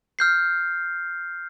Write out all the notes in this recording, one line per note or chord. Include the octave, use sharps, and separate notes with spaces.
F6 G6 C7